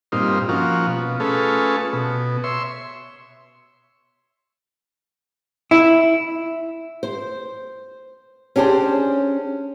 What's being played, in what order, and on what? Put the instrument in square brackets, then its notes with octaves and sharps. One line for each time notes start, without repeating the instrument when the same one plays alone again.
[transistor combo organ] G2 A#2 C4 D#4 F4
F3 A#3 C#4 F4 F#4
B2
A3 C#4 F4 G#4 A4 B4
B2
C#5 E5 C6
[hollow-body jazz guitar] E4
[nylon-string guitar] C5
C#4 D4 G4 G#4 C5